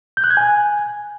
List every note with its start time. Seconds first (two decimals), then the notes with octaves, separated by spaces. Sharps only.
0.17 G6
0.24 F#6
0.30 G#6
0.37 G#5